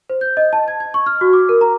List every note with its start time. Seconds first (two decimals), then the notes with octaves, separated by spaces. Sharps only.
0.10 C5
0.21 G6
0.37 D#5
0.53 A5
0.68 G#6
0.80 G#6
0.94 C#6
1.06 F6
1.21 F#4
1.33 D6
1.49 A#4
1.61 A#5